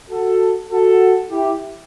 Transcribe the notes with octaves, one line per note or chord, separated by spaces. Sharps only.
F#4 A4
F#4 A4
E4 G4